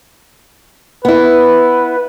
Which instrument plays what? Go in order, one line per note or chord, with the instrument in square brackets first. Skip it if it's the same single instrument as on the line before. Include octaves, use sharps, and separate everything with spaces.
[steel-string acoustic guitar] B3 E4 [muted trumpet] B4